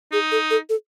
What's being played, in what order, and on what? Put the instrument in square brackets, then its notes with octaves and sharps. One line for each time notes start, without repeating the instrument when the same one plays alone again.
[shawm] D#4 [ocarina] G#4
[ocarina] A4
A4
A4